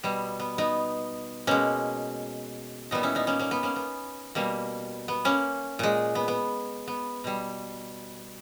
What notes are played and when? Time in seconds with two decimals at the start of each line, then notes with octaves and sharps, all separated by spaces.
0.03 B2 G3 B3
0.40 B3
0.58 B3 D#4
1.47 B2 G#3 A#3 C#4
2.91 A#2 G3 B3 D#4
3.03 C#4 E4
3.15 B3 D#4
3.27 A#3 C#4
3.39 A#3 C#4
3.51 B3
3.63 A#3 C#4
3.76 B3
4.35 B2 G3 A#3
5.08 B3
5.25 A#3 C#4
5.79 A#2 G#3
6.15 B3
6.28 B3
6.88 B3
7.24 B2 G3